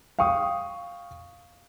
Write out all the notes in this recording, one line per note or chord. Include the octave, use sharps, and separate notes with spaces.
F5 G5 C#6 D#6